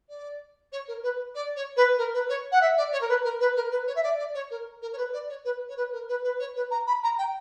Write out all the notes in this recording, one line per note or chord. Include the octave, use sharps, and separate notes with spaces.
D5
C#5
A#4
B4
D5
C#5
B4
A#4
B4
C#5
F#5
E5
D5
C#5
A#4
B4
A#4
B4
A#4
B4
C#5
E5
D5
D5
C#5
A#4
A#4
C#5
B4
D5
C#5
B4
C#5
B4
A#4
B4
B4
C#5
B4
A#5
B5
A#5
G5